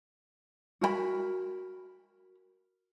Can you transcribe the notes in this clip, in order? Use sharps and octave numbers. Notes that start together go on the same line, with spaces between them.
F#4 A#4 G5 B5